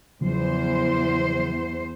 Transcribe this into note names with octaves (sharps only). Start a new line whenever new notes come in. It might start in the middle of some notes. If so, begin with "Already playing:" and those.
E2 C#3 F3 F#3 C5